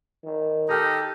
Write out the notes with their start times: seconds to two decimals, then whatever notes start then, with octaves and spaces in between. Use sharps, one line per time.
0.25 D#3
0.69 D#4 G4 A4 G5 F6 G6